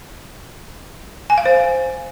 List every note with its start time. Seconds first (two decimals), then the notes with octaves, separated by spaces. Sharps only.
1.30 G#5
1.38 F5
1.45 C5